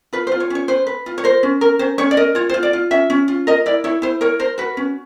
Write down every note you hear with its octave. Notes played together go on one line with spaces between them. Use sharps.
F4 B4
C5
F4
C#5
C#4 C#5
B4 C5
B4
F4
C#5
A#4 C5
C#4
A#4
C#4 C5
C#4 C#5
D5
A#4 D#5
F4 C#5
C5
F4
D5
F4
C#4 E5
C#4
F4
A#4 D#5
E4 D5
E4 C#5
E4 C5
A#4 C#5
A#4 C5
F#4 B4
C#4